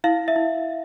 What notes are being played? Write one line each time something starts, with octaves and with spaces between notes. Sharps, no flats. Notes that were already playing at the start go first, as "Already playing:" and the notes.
E4 F5
E5
E4